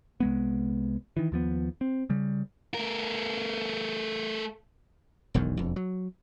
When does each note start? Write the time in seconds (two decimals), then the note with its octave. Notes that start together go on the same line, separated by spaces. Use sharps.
0.20 C2 G#3 B3
1.17 D#3 E3
1.32 D#2 F3 B3
1.81 C4
2.10 C#3 G3
2.74 A3 A#4
5.34 E1 B1 F#2 D#3
5.57 E1 F2
5.76 F#3